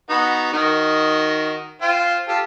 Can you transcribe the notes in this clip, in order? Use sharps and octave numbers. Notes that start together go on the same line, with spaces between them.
B3 D#4 F#4
D#3 F#4 D#5
F4 C5 G5
F4 G4 A4